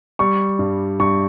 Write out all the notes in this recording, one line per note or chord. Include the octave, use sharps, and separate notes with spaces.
G3 C#6
G2
G2 C#6